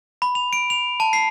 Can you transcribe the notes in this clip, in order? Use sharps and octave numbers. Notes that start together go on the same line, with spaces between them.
B5
F7
D7
F7
A5
C7